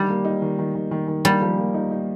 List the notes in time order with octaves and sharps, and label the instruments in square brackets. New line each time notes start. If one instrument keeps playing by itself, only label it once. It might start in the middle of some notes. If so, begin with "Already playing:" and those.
Already playing: [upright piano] D#3 [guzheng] G3
[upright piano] A#3
D#4
D#3
D#3
D#3
D#3
D#3
[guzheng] G3 [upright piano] A#3
[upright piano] F3
A#3
D#4
D#4